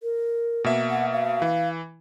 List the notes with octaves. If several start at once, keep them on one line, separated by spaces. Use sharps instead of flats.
A#4
B2 A#3 E5
F#5
F5
E3